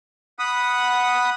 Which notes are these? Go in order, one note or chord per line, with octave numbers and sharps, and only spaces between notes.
F#5 B5 D#6